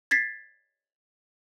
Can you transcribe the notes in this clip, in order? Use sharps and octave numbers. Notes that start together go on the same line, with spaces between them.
G#6 A6 B6 C7